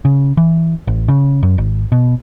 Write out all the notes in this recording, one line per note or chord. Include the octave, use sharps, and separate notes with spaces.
C#3
E3
A1
C#3
F#2
G#1
B2